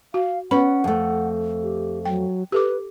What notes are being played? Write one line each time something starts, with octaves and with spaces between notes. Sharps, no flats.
F#4 F5
B3 C#4 B4 F#5 B5
F2 A3
G4
F#3 G5
G4 A4 B4 D6